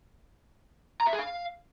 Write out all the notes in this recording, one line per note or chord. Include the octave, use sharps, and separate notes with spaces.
A#5
E5
G#4
F5